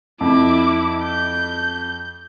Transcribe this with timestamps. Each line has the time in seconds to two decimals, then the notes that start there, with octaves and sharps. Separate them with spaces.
0.21 F2 E4 D6
1.04 G6